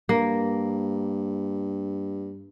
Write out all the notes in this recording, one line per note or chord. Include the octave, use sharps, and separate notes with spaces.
G2 A#3